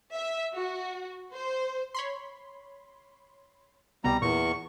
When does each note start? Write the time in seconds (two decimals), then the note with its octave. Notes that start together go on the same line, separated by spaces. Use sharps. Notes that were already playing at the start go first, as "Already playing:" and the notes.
0.14 E5
0.54 F#4
1.34 C5
1.94 C#5 B5 C6
4.04 C2 B2 G3 B3 A#5
4.22 E2 A#2 C#6